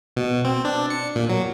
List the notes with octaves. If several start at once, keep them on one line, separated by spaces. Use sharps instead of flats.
B2
C4
D4
C#7
A#2
F#3